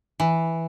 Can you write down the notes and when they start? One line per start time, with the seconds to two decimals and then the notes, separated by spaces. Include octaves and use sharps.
0.20 E3